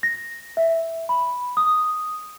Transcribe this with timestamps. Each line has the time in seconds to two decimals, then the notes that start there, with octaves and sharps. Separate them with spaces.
0.03 A#6
0.57 E5
1.09 B5
1.57 D#6